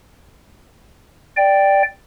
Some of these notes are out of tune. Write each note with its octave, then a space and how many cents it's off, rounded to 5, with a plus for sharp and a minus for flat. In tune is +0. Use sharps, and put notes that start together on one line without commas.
D5 +0 G5 +0